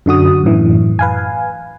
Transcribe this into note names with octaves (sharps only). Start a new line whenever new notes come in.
F#2 D3 F#4 D#6
F#2 A2 E3
B4 F5 G#5